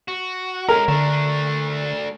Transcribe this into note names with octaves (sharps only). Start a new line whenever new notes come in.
F#4
G#3 C#4 A4 A#4
D3 A3 D4